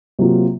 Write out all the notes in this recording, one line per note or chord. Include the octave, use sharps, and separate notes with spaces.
C3 F#3 A#3 F4